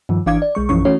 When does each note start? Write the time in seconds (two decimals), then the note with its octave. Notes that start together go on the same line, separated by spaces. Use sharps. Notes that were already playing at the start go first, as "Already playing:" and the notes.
0.09 G2 D#3 F3
0.26 G#1 E3 D4 F5 D6 G#6
0.42 D5
0.55 B1 G#3 C#6
0.69 A#1 F#2 E3 F3 C#4 C#6
0.85 E3 A3 C#4 F#4 C#5